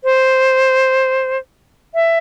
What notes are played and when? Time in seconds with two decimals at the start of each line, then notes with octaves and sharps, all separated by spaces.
0.04 C5
1.94 E5